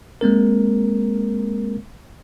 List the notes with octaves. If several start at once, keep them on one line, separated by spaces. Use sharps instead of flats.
G#3 A#3 C4 A#4